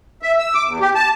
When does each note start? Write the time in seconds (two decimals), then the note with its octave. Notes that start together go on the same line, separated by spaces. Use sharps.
0.22 E5
0.38 E6
0.54 D6
0.67 E2
0.80 G4
0.95 A5